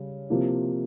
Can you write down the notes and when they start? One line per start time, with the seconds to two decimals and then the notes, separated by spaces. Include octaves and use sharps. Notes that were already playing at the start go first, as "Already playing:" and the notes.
Already playing: C#3 G3
0.30 C3 F3 A#3 E4